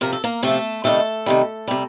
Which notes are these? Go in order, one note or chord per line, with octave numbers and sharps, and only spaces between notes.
C3 F3 A#4
A4
A#3 A#4
C3 F3 A3 A4
C3 D#3 G3 A3 A4
C3 D#3 G3
C3 G3